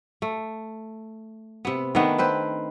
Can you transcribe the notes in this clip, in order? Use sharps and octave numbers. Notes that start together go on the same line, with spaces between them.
A3
C3 B3
D#3 A3 B3 D4
C4 B4 C5